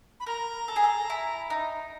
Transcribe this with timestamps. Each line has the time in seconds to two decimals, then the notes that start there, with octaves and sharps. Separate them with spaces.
0.20 B5
0.26 A#4 A#5
0.68 A4
0.76 G#4
0.84 A4
1.10 E4
1.50 D#4